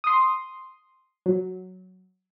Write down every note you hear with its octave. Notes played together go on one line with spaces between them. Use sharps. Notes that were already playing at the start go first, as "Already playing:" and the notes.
C6 D#6
F#3